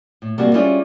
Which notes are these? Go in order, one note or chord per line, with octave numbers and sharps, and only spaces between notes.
A2
C3 G3 A#3 F#4 G#4
G3 C#4 E4 F4 G#4